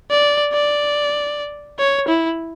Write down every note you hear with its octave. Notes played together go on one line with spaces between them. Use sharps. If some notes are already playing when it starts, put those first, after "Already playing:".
D5
D5
C#5
E4